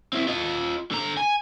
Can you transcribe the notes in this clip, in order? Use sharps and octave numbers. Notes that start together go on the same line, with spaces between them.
C4 E4
F4 D#5
D3 A#5
G#5